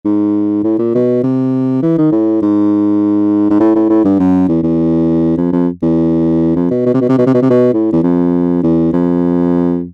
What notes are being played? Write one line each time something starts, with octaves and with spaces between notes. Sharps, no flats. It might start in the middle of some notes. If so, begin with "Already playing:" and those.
G#2
A2
A#2
B2
C3
E3
D#3
A2
G#2
G#2
A2
A2
A2
G2
F#2
E2
E2
F2
F2
E2
F2
B2
B2
C3
B2
C3
B2
C3
B2
C3
B2
A2
E2
F2
E2
F2